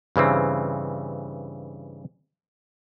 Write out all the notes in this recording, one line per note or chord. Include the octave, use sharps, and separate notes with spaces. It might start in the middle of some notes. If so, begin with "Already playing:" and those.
G2 C#3 E3 C4